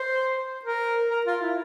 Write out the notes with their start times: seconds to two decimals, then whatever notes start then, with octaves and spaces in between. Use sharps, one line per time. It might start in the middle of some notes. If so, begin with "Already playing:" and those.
Already playing: C5
0.65 A#4
1.10 A#4
1.26 F4
1.42 E4